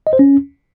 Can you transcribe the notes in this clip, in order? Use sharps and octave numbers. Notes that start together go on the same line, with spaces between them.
D#5
C5
C#4